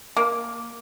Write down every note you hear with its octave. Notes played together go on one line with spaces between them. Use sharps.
A#3